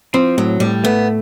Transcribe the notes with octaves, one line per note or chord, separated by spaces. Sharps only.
F3 C4
A2 F#3
A2 G3
A3 B3